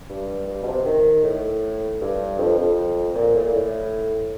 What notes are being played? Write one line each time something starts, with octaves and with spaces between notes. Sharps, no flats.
G2
G2
B2
C3
D#3
A2
G2
F2
F2
A#2
A2
A#2
A2